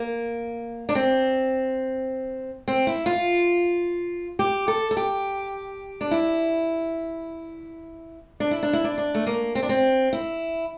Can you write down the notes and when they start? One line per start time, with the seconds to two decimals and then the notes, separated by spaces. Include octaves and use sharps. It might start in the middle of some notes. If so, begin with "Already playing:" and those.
Already playing: A#3
0.89 D4
0.95 C4
2.68 C4
2.87 E4
3.06 F4
4.39 G4
4.68 A4
4.91 A4
4.97 G4
6.01 D4
6.11 E4
8.40 D4
8.51 E4
8.63 D4
8.73 E4
8.84 D4
8.98 D4
9.15 A3
9.27 A#3
9.55 C4
9.63 D4
9.69 C4
10.13 E4